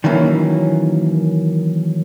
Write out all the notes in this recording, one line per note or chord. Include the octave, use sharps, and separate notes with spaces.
D#3 E3 F#3 A#3 C#4